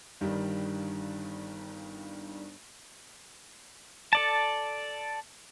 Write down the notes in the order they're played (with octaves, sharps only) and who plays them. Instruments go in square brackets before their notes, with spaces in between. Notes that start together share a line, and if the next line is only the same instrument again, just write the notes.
[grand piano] G1 G2 D#3 G3
[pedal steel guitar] A4 D5 A5